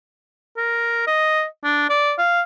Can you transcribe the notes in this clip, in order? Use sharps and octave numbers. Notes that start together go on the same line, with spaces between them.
A#4
D#5
D4
D5
F5